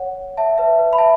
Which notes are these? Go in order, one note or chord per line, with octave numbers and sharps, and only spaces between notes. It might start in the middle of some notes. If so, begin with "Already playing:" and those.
Already playing: C#5 F#5
E5 A5
B4 E5
B4
B5
E5 A5